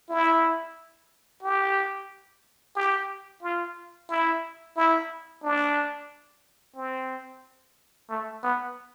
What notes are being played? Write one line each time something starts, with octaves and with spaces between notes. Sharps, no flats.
E4
G4
G4
F4
E4
E4
D4
C4
A3
B3